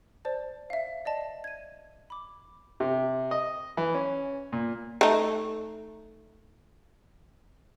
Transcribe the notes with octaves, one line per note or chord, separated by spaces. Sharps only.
C5 D5 A5
E5 F5
D5 D#5 A5
G#6 D#7
B5 D6
C3
D#5
E3
C#4
A#2
A3 D#4